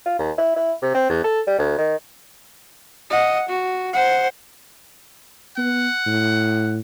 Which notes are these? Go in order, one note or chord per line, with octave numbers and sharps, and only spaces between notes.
F4
D#2
E4
E4
C3
C4
E2
A4
G3
D2
D#3
D#5 F#5
F#4
C5 F#5
B3 F#5
A2